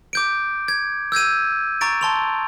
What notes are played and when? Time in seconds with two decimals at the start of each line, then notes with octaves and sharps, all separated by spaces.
0.13 D6 G6 D7
0.68 G#6
1.12 E6 G6 G#6 D#7
1.81 A#5 C#6 A6 D7
2.01 A5 C6 F7